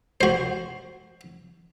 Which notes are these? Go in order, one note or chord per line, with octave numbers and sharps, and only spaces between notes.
F#4 C5